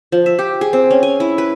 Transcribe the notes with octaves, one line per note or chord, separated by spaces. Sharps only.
F3
E5
G4
G#4
C4
C#4
G#5
E4
B4